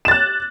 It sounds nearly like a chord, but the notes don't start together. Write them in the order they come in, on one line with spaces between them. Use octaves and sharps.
E7 A6 F#6